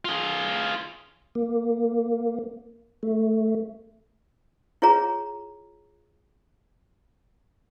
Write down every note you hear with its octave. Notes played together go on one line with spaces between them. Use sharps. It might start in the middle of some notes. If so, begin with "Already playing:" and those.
F4 G#4
A#3
A3
E4 F4 G#4 C#5 A#5